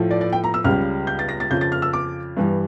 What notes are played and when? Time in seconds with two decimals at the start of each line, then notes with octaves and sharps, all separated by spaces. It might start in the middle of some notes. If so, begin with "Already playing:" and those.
Already playing: A2 F3 A3
0.11 D5
0.21 D5
0.33 G5
0.44 A#5
0.54 E6
0.64 C#2 C#3 G3 F6
1.07 G6
1.19 A6
1.29 A#6
1.40 A6
1.50 F2 C#3 F3 G6
1.61 A6
1.72 F6
1.82 E6
1.93 D6
2.37 G2 E3 G3